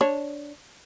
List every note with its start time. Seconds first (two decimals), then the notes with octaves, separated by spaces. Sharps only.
0.01 D4 C#5